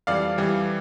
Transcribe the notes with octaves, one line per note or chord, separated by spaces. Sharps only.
F2 E3 G3 D5 F5
F2 E3 G3